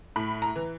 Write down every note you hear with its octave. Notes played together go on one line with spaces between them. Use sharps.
A2 B5
A#5
E3